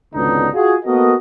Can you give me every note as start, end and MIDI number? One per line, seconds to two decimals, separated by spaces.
0.14 0.48 32
0.14 0.48 37
0.14 0.48 50
0.14 0.48 59
0.14 0.48 62
0.14 0.48 63
0.54 0.75 65
0.54 0.75 66
0.54 0.75 68
0.85 1.14 58
0.85 1.14 59
0.85 1.14 66
0.85 1.14 69
0.85 1.14 70
0.85 1.14 75